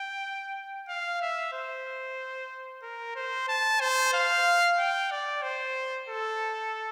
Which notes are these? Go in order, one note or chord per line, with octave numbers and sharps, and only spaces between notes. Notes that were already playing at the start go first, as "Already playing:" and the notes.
Already playing: G5
F5
E5
C5
A#4
C5
A5
C5
F5
G5
D5
C5
A4